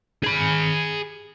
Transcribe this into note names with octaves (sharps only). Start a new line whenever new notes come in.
G#4 B5